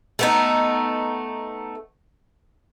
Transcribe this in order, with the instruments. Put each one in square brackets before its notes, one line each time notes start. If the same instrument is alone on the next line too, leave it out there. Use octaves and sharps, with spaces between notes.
[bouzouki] A3 B3 D#4